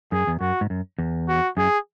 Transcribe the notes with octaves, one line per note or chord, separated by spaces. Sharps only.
F#2 G#4
E2
F#2 F#4
G#2
F#2
E2
F#4
F#2 G#4